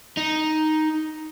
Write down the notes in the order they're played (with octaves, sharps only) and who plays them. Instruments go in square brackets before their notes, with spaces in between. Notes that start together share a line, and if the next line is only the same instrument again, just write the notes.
[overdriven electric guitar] D#4